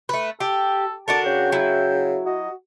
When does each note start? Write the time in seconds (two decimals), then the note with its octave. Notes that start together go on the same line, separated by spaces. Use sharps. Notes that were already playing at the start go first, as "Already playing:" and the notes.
0.09 A3 B4
0.40 G4 A4
1.08 D3 D4 F#4 A#4 A5
1.26 C#3 G5
1.52 F#3 E4
2.26 F#4 D#5